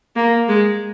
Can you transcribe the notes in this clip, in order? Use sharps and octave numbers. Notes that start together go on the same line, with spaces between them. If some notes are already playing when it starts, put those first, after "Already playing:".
A#3
G#3